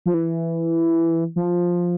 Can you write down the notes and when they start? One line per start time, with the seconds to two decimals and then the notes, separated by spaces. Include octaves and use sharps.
0.06 F3
0.14 E3
1.36 F3